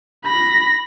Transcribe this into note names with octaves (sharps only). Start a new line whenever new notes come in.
B5 A#6